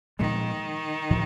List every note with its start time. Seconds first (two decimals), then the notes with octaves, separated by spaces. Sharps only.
0.19 A#2 D#3 F3 G#3 B3
1.10 A2 F3